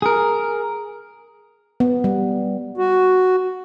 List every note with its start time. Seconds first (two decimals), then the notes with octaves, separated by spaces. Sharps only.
0.02 G#4 A#4
1.80 B3
2.04 G3
2.77 F#4